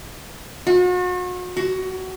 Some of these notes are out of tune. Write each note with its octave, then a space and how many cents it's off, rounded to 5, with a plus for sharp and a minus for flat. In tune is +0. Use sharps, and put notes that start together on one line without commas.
F#4 -40
F#4 +20